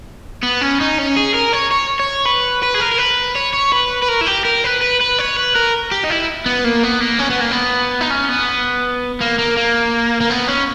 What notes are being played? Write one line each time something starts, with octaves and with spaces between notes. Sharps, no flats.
B3
C#4
D#4
C#4
G#4
A#4
C#5
C#5
C#5
B4
B4
G#4
A#4
A#4
B4
C#5
C#5
B4
B4
A#4
E4
G4
A#4
B4
B4
B4
C#5
B4
A#4
G4
D#4
E4
B3
A#3
B3
A#3
C#4
B3
A#3
B3
D#4
C#4
B3
A#3
A#3
A#3
A#3
B3
C#4